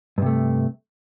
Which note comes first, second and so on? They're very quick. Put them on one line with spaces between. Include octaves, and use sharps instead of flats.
G2 C3 A3